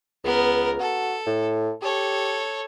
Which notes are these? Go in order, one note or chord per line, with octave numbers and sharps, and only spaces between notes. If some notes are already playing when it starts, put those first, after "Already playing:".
C#2 B3 A#4
F#4 A4
A2
G4 A4 C#5